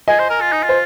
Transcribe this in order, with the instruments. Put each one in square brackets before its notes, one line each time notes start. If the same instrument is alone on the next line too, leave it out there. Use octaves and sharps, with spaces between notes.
[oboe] G#4 [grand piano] D#5 G#5
[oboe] C5
A#4
F4
D#4
F4
[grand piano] C5